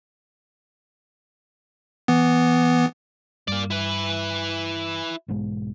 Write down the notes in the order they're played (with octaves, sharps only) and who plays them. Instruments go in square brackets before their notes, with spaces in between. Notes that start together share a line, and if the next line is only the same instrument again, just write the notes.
[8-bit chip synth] E3 B3
[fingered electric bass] G2 [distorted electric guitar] A#3 D5
[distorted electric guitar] E4 B4
[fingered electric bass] B1 G#2 G#3